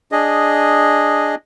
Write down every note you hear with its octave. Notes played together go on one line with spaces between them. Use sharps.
D4 G#4 D#5